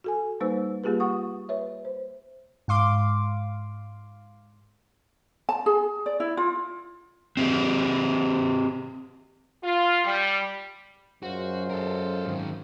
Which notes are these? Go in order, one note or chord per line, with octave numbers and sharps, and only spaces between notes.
F#4 A4 G#5
G3 A#3 D#4 B4 C5 E6
G3 A#3 F4 G4 G#4 B4
F#5 C#6 D#6
B4 C#5 E5
C5
G#2 F5 C6 D6
A5
G#4
D5
E4
F4
C4 G4 G#4 B4
F4
G3
F#2 G#3 F4 F#4 C5
A4 A#4
G#2 D#3